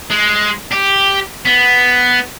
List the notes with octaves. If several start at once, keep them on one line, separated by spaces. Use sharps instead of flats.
G#3
G4
B3